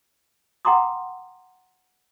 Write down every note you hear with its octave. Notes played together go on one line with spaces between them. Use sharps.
F#5 G5 A#5 C6 D6 D#6